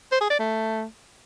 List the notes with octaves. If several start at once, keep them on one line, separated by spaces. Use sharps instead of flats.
C5
G#4
D5
A3